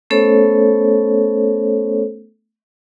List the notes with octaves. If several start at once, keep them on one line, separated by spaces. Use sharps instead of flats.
A3 B3 C#4 A4 C5 C#5